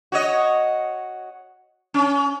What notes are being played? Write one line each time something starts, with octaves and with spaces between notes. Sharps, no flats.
F#4 C#5 D#5
C#4